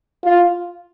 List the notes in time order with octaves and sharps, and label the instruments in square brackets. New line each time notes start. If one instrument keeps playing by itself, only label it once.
[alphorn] F4